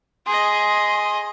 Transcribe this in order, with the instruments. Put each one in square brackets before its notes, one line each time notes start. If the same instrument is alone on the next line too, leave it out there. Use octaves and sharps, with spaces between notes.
[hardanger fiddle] G#4 D#5 [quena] C6